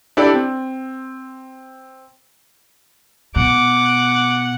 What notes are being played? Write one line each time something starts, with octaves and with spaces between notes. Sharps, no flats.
D4 E4 G4 A4 D5
C4
B2 F#5 D6